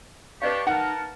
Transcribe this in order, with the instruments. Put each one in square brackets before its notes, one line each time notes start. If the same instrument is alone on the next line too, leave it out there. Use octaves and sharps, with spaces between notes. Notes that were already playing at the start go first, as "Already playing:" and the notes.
[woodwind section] D4 G4 [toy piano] B4 D#5 F5 [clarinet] C#6
[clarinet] D#4 [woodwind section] A#4 A5 [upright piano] F#5